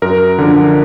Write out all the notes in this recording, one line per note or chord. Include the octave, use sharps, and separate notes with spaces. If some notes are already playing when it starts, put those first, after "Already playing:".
F#2 A#4
D3 F3